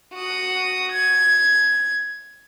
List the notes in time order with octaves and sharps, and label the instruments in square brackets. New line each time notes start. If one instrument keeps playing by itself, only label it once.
[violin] F#4 D#6
G#6